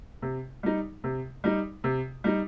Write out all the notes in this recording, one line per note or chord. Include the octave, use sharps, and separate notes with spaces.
C3
G3 D#4
C3
G3 D#4
C3
G3 D#4